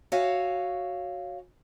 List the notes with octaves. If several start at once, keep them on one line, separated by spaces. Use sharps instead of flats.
F#4 C#5 E5 F5 G#5